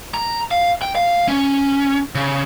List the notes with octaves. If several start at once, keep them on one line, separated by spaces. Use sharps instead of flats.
A#5
F5
G5
F5
C#4
C#3